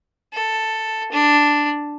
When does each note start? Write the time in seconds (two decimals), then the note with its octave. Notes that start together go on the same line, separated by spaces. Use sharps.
0.34 A4
1.12 D4